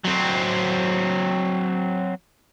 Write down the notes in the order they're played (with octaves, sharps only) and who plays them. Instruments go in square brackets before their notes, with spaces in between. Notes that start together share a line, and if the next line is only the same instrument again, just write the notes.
[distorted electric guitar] F#3 C4